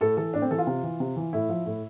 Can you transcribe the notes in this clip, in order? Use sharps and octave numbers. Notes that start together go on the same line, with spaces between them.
A2 A4
E3 A4
A2 D4
C4
E3 A4
F4
C3
E3
C3
E3
A2 E4
F3
A2